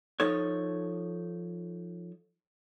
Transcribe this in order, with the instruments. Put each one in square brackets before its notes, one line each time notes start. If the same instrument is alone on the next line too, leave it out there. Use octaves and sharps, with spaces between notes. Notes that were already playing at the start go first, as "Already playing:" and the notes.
[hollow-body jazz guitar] F3 D#4 A4 C#5